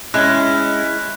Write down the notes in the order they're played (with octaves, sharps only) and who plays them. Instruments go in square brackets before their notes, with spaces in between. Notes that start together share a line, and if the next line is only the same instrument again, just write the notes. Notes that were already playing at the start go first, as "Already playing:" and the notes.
[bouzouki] G#3 [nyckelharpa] C#4 [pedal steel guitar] E4 [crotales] F#6